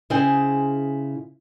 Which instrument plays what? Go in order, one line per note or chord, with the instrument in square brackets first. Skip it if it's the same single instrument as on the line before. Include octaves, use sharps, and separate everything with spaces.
[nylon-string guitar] C#3 E4 G#4 C5 G5 G#5